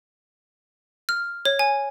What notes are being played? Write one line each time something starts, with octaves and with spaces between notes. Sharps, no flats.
F6
C#5
G#5